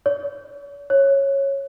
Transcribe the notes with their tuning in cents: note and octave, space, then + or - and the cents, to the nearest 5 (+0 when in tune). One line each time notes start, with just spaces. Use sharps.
C#5 +40
C#5 -10